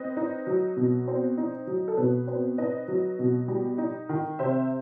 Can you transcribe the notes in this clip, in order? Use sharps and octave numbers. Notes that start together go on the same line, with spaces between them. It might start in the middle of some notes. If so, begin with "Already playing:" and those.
Already playing: C4 B4 D#5
D#4
F#3
B2
C4
D#4
F#3
A4
B2 B4
C4 B4
D#4 B4 D#5
F#3
B2
G3
D#4
D#3
C3 C5 E5